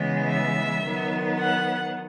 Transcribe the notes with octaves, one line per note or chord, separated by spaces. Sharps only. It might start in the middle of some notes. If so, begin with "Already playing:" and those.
Already playing: C#3 E3 G#3 B3
E5
D#3 F#3 B3
F#5